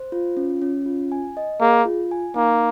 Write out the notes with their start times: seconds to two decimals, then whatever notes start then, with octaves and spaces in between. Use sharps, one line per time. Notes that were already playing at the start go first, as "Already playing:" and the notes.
Already playing: C5
0.12 F4
0.37 C#4
0.62 C#4
0.86 F4
1.12 G#5
1.37 D#5
1.61 A#3 G#4
1.85 F4
2.11 G#5
2.36 A#3 D#4